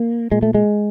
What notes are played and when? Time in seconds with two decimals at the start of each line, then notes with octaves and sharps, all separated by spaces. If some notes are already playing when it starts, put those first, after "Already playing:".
Already playing: A#3
0.32 A#2 G#3
0.43 A3
0.55 G#3